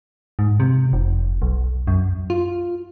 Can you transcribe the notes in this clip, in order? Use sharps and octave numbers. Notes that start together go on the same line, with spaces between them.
G#2
C3
F1
B1
F#2
F4